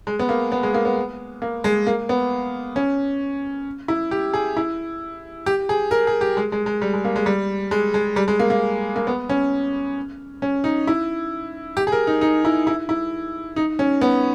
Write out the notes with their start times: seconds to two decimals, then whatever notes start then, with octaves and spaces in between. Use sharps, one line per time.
0.07 G#3
0.19 B3
0.29 A#3
0.52 B3
0.63 G#3
0.74 A#3
0.85 B3
1.42 A#3
1.64 G#3
1.87 A#3
2.09 B3
2.76 C#4
3.88 E4
4.11 G4
4.34 G#4
4.57 E4
5.46 G4
5.69 G#4
5.91 A#4
6.07 G#4
6.21 G4
6.37 G#3
6.52 G#3
6.66 G#3
6.82 G3
6.93 G#3
7.05 A#3
7.16 G#3
7.26 G3
7.71 G#3
7.94 G#3
8.16 G3
8.28 G#3
8.40 A#3
8.50 A#3
8.96 A#3
9.07 B3
9.29 C#4
10.42 C#4
10.64 D#4
10.87 E4
11.77 G4
11.87 G#4
11.92 A#4
12.07 D#4
12.21 D#4
12.45 E4
12.67 E4
12.89 E4
13.56 D#4
13.79 C#4
14.01 B3